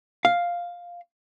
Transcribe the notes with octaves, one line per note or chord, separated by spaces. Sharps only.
F5